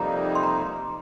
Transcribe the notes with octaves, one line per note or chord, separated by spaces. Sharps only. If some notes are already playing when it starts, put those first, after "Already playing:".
Already playing: F2 C3 G3 A#3 D#4 A#5
C6
A#5